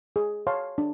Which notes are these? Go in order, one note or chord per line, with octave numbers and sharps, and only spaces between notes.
G#4
C#5 F5 A5 C6
D4